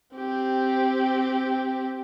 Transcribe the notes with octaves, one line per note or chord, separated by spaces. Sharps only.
C4 G4